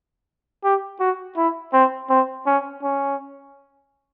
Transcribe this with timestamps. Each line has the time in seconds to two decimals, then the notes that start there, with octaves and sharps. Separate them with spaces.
0.64 G4
1.00 F#4
1.37 E4
1.73 C4
2.10 C4
2.47 C#4
2.83 C#4